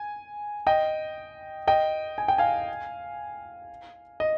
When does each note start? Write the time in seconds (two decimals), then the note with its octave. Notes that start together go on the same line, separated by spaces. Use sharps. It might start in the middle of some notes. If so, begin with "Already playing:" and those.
Already playing: G#5
0.67 D#5 G5
1.67 D#5 G5
2.18 G#5
2.28 G5
2.38 F5 G#5
4.20 D#5